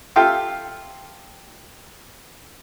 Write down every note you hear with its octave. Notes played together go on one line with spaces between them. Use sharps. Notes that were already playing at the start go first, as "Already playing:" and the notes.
F4 G4 A4 E5 F5 G5